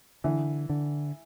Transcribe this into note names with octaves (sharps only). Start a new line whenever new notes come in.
D3 E3
D3